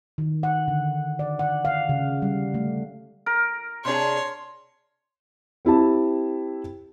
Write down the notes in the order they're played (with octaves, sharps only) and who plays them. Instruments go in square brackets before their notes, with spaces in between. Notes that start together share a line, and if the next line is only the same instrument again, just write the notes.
[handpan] D#3
F#5
D3
D5
F#5
F5
C#3
G3
A3
[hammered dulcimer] A#4
[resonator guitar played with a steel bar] C3 D4 G#4 [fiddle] C#5 [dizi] C6
[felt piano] C4 E4 G4 A5